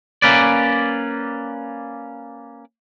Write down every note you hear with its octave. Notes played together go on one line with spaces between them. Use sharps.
A#3 C#4 B4 D5